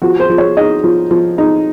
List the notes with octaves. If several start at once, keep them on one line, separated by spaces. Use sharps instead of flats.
F3 F#4
C5
F3
C#5
D#4 D#5
F3
F3
D#4